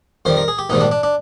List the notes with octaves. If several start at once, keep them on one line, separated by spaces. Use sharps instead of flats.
F2 D#3 G3 C5
A#4
G#4
G4
A#1 G#2 D#3 G3 D#4
D4
D4
D4